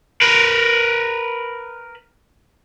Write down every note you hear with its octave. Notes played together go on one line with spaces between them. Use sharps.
A#4 B4